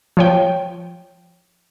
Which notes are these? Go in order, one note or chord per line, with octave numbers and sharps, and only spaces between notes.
F3 C#5 G5